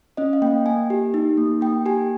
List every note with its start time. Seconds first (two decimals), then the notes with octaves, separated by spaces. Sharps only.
0.17 C#4 D#5
0.33 F5
0.42 A#3 G5
0.66 A#3 G#5
0.90 G4
1.14 D#4
1.37 A#3
1.61 A#3 G5
1.86 G4 G#5